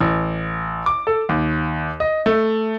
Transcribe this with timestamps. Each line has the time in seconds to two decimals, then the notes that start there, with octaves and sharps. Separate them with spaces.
0.01 A1
0.86 D6
1.07 A4
1.29 D#2
2.00 D#5
2.26 A3